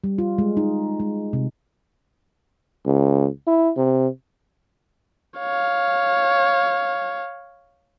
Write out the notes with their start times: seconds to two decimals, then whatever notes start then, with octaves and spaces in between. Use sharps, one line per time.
0.04 G3
0.18 F4
0.38 G#3
0.57 D#4
1.00 G#3
1.33 C3
2.86 C#2
3.47 E4
3.77 C3
5.39 C#5 F5